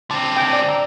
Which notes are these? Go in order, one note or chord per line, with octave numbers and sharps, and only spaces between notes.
D3 C4 A5
G5 G#5
D5
D5 A#5 E6